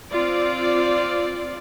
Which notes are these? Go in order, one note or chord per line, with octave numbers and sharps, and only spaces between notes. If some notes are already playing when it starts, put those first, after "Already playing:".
C4 F4 D5